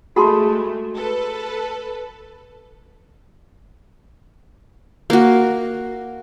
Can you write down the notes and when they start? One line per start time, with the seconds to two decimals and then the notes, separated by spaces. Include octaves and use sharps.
0.16 G#3 A3 F#4 G#4 A5 B5 C6
0.95 A4 B4
5.10 A#3 F#4